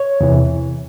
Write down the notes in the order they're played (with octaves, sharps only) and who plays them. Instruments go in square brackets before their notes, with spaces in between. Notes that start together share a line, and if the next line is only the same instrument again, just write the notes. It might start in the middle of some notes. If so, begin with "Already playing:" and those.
Already playing: [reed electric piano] C#5
E2 C3 E3